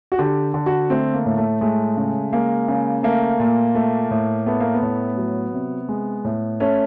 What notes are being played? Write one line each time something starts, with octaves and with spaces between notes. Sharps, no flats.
F#4
D3 G4
D3
F#4
A3 C4
A#3
A2
A3
G#3 A3
C#3
G#3 A#3
C#3
A3 A#3
A#2
A3
A2
A3 B3
A#3
B3
A2
F#3
C3
G#3
A2
A3 C#4